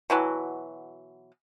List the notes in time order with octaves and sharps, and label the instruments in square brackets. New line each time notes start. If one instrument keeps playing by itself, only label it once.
[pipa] B2 E3 F#3